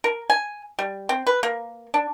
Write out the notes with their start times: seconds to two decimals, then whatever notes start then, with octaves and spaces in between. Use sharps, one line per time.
0.04 A#4
0.30 G#5
0.79 G3
1.09 C4
1.27 B4
1.43 A#3
1.94 D4